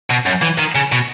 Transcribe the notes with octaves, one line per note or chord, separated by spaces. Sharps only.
B2
F#2
E3
D#3
C#3
B2